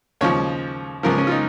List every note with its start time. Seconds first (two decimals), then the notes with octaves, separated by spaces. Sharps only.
0.21 D#2 C#3 F3 C#5
1.03 C#2 C#3 F3 A#4
1.18 C#4
1.27 F4
1.31 D#4